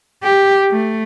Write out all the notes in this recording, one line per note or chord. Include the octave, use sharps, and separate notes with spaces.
G4
A3